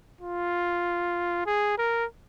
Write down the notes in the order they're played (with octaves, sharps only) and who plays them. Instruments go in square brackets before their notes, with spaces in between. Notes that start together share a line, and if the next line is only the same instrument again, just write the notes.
[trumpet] F4
G#4
A#4